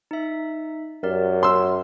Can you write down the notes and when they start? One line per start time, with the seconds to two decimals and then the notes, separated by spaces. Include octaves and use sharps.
0.11 D#4 E5
1.03 F#2 G4 A#4 D5
1.43 A#4 C6 E6